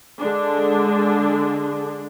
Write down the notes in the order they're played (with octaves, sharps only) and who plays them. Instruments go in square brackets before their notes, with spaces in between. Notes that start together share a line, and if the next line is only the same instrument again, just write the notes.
[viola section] D3 G#3 D4